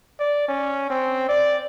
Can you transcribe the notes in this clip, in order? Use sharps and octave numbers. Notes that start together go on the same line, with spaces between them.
D5
C#4
C4
D5